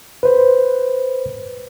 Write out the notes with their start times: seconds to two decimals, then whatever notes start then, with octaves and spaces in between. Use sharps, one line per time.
0.23 B4 C5